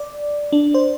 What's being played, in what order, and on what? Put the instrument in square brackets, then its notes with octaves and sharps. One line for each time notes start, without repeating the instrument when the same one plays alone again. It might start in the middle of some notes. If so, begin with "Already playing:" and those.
Already playing: [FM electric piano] D5
D4
C5